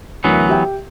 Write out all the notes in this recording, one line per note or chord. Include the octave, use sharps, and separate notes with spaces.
D2 E3 F#3 B3 A#4
G4 E5 G5